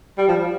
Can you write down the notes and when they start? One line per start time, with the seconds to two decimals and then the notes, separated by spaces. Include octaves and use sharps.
0.18 G3
0.28 F3